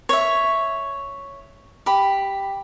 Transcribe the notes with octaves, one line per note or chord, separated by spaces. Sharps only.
C#5 E5
G4 B5